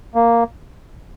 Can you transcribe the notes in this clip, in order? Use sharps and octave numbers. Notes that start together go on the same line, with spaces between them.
A#3